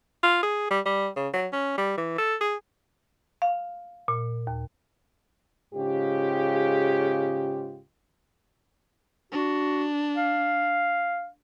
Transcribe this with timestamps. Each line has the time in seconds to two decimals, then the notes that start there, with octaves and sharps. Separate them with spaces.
0.23 F4
0.43 G#4
0.70 G3
0.85 G3
1.16 C#3
1.33 F#3
1.52 C#4
1.78 G3
1.98 E3
2.18 A4
2.41 G#4
3.42 F5
4.08 A#2
4.47 D#2
5.74 G#2 C#3 F4 G4
9.32 D4 F#4
10.17 F5